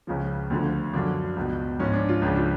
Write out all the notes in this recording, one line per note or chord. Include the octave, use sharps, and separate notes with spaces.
C#2 C#3 F3
D2 D3 F3
F#2 D3 F3 D4
C#2 B2
G#2 F3 C#4
D4
F4
C#2 C#3 F3 D4
F4